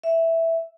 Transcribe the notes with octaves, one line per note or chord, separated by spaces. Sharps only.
E5